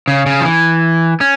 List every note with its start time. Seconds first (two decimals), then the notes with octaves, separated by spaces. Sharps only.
0.08 C#3
0.26 C#3
0.41 F3
0.45 E3
1.21 C#4